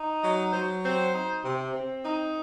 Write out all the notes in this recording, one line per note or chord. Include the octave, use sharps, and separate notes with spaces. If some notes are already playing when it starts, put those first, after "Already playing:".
Already playing: D#4
F#3 D#5
F#3 C5
C4 C5
D#4
C3
C4
D#4